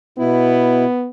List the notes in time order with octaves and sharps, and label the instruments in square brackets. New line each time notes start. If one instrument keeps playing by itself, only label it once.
[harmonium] B2 E4 [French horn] B3